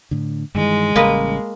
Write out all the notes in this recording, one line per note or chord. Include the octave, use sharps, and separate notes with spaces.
A2 D3
G2 D#3 E3 G#3
A1 C#3 G3 A#3 B4 D#5